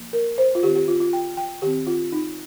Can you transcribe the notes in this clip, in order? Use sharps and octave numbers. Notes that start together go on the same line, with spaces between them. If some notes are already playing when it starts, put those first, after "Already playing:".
Already playing: F3 A#3
A#4
C5
F4
D#3 C4 G4
G4
F4
F4
G5
G5
D#3 C4 G4
F4
D#4